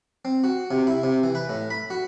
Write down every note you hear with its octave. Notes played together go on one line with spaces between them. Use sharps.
C4
F#4
C3
E4
C3
E3
B4
A2
B5
F#4